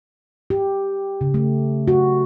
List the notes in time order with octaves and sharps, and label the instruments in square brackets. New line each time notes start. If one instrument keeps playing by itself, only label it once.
[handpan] G4
C#3
A3
F#4